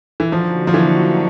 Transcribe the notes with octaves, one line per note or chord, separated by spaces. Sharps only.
E3
D3 F3 F#3 A#3 D#4 F#4
F3
E3